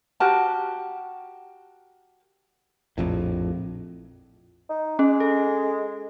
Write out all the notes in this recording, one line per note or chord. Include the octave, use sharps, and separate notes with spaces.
F#4 G4 A#4 A5
A#1 F2 A2
D#4
G#3 C#4
A4